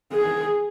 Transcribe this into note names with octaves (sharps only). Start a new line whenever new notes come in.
G#4